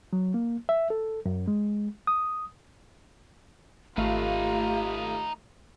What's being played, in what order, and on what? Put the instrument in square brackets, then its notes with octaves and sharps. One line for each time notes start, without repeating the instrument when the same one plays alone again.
[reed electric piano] F#3
A#3
E5
A4
F#2
G#3
D#6
[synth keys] G#1 A3 F5 [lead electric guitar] D#4 B4 [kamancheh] F4 [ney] G4